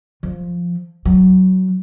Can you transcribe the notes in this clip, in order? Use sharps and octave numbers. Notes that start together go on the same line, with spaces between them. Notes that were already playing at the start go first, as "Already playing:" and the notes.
F3
F#3